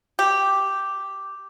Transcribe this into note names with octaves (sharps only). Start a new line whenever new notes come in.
G4